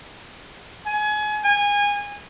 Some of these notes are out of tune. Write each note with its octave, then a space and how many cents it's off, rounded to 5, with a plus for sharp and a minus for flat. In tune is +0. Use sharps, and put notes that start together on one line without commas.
G#5 +30
G#5 -25